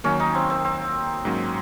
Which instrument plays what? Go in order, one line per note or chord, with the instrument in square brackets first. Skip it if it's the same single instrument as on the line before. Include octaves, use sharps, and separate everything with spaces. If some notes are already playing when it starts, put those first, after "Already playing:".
[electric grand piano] D#2 D#3 F#3 A#3 [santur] C#4
[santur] D#4
C4
C4
C4
[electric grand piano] G#2 F#3 A#3 C#4